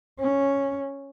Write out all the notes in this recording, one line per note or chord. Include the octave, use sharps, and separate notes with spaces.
C#4